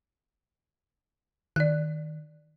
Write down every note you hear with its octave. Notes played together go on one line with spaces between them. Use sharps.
D#3 D5 F#6